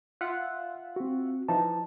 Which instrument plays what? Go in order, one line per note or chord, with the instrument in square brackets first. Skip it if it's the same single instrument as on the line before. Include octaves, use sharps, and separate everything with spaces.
[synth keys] F4 E5 F#5 [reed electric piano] F#6
[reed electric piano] C4 F#4
[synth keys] E3 F3 D#4 [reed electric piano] A5